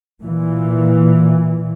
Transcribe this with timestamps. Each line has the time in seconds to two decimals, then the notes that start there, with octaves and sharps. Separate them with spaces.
0.23 A#2 E3